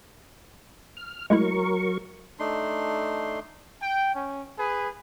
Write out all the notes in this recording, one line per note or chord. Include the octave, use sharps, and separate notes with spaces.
F6
F#3 G#3 A3 E4 A#4 C#6
A3 D4 D#4 C6
G5
C#4
G#4 B4